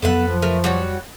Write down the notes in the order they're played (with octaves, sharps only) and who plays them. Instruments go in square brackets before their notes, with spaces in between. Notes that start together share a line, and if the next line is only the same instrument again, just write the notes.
[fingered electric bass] F2 F#3 [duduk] B3 [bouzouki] A4 B4 F#5
[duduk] F3
[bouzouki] A3 A#4 B4
G3 F#4 C#5